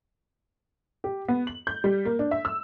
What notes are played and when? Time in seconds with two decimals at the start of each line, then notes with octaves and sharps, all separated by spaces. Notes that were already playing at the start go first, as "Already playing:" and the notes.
1.04 G4
1.28 B3
1.47 F#7
1.67 G6
1.84 G3
2.05 A#3
2.19 D4
2.31 E5
2.45 E6